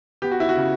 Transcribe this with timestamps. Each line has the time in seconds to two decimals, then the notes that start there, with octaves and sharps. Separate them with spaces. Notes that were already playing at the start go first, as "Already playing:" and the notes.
0.22 B3 G4
0.32 F#4
0.40 E4
0.49 F#4
0.56 C#3